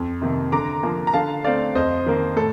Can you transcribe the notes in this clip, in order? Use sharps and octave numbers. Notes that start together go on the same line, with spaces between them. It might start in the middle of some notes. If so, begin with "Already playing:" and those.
Already playing: F2
C3 D#3 A#3
D3 A#5 D6
F3 A#3
A#5
D3 F5 A5
A3 C4 D5 F5
F2 C5 D#5
D#3 A#3
A2 A4